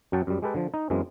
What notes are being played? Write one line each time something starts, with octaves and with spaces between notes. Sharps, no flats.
F#2 F#3 F#5 G5 A5
F#2 G3
G#3 G4 A4 B4 G5
D3 F3
D#4
F#2 E3 G#3 A#3 C4